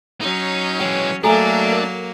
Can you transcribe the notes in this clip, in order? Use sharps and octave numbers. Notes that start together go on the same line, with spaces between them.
F#3 C#4 D#4
E3 G#3 C#5 G5
F#3 A3 A#3 D4 A4 G#5 A#5
A#4